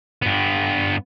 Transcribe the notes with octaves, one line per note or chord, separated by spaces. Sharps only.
G2 B3